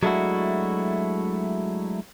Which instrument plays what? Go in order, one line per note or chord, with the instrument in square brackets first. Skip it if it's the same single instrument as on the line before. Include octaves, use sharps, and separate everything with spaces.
[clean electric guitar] F#3 G#3 A3 D4 E4 F#4